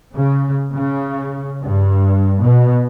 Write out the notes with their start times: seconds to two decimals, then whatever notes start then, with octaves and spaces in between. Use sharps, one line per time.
0.14 C#3
0.75 C#3
1.61 G2
2.41 B2